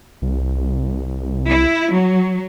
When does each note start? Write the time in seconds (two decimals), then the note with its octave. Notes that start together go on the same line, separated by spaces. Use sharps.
0.22 C2
1.48 E4
1.94 F#3